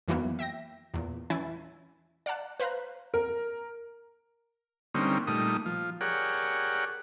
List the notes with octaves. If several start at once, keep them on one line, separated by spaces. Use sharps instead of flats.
F2 D#3 E3 F#3 A#3 B3
E5 G5 A#6
E2 A#2
E3 C#4 E4 G#5 A6
D5 F5 F#5 A5 F#6
B4 C5 F5 A#5 F#6
A#4
D3 G3 A#3 C4 C#4 D#4
A#2 G3 A3 D#4 D#6
F3
G4 G#4 A#4 C#5 D5 F#5